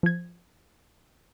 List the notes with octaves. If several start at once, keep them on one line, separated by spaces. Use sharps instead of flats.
F3 G#6